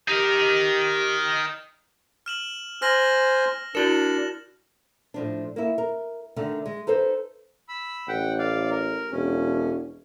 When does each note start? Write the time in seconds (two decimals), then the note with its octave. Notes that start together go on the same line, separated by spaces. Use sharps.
0.08 D#4 G4 A#4
2.26 F6 E7 F#7
2.82 C5 G#5 F6 A#6 F#7
3.75 D4 E4 F#4 A#4 E7 F#7
5.14 A2 F3 D4
5.56 A#3 E4
5.78 A#4
6.36 D3 D#3 A3
6.66 G#3
6.87 D#4 A4 B4 C5
7.69 B5 E6
8.08 A1 F#5 G5
8.39 D5 F5
8.70 A#4
9.11 E1 C#4